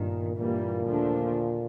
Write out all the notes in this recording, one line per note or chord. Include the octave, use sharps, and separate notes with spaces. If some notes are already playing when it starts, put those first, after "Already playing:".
Already playing: G1 G2 A#2 D#3
G2 A#2 E3 G3 A#3
D#2 D3 F3 A3 D4